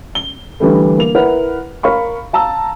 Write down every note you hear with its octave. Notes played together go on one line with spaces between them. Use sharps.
G7
D3 E3 G3 A3
A#3 F7
E4 A#4 B4 F#5
A#4 F5 B5 C#6
F5 A5 A#5 E6